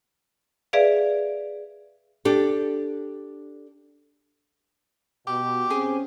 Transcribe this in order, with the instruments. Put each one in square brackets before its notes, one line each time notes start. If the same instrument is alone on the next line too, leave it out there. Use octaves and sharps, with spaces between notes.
[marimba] G#4 B4 D5 E5 F5
[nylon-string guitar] D4 G4 A4
[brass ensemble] B2 [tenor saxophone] G4
[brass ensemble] C4 [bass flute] C#4 [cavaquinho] G#4